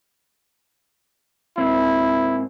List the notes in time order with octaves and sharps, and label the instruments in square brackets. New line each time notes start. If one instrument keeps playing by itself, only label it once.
[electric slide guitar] G#2 A#3 C4 [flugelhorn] E4